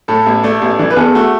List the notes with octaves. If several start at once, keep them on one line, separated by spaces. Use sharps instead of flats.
A2 A4
A1
A3 D5
A1
E3 D5
B4
E2 A4
A3 F#4